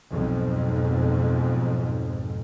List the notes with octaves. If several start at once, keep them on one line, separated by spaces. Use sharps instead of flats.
B1 F2 G#2